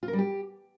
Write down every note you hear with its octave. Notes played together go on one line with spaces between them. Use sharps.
F4
A#4
G3
G4